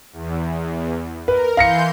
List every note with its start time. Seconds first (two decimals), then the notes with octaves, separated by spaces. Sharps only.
0.13 E2
1.28 A#4 B4
1.57 E3 F5 C6 G6 A#6 C#7